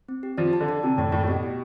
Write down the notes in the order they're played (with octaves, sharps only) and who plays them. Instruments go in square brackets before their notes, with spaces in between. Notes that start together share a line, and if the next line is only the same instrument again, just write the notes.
[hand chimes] C4
G4
[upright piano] F3 [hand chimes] D5
[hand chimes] A5
[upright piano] D3
[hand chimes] D5
[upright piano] C3 [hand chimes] A5
[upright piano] A2 [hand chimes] D5
[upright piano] A2 [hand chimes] D5
[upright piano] A2
[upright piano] B2 [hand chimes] G4
[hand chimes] G4